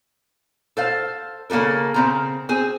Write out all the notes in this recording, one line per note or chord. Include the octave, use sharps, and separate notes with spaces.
A4 C5 F5
C#3 A#3 D#4 A4 A#4
C#3 C4 A#5
C4 G#4